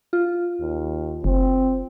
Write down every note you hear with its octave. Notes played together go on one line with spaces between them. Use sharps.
F4
D#2
F#1 C4